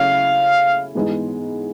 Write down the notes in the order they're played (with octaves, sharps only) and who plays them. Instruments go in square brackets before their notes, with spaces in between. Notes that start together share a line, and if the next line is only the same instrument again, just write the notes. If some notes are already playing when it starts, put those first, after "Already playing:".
Already playing: [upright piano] C#3 F#3 A3 C#4 E4 [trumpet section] F5
[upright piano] G#2 E3 G#3 B3 D#4